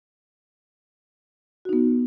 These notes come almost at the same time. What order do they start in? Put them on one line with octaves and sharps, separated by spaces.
F#4 D#4 B3